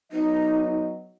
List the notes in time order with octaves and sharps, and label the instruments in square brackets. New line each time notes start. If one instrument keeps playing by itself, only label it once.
[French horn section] F#3 B3 D#5 [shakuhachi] D#4